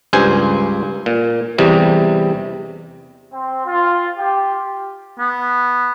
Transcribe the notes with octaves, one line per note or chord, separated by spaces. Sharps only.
C#2 G2 C5 G#5
A#2
E2 C3 G3
C4
F4
G4
B3